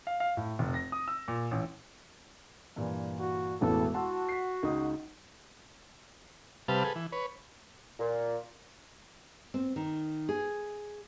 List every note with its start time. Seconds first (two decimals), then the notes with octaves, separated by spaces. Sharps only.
0.07 F5
0.20 F5
0.37 A2
0.59 F1
0.74 A#6
0.92 D#6
1.08 E6
1.28 A#2
1.51 A1
2.76 G2 A#2 E3
3.19 F#4
3.61 E1 A1 B3 A4
3.94 F#4 F#5 A5 C6 E6
4.29 B6 C7
4.63 C#2 D#4 D#6
6.68 C3 G3 B4 F5 A5
6.84 G#4 A4 B4
6.96 E3
7.12 B4 C#5
7.99 A#2
9.54 C4
9.76 D#3
10.29 G#4